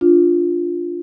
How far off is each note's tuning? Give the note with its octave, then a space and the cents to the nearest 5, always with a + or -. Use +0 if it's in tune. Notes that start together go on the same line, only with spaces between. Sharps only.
D4 +0 F4 +0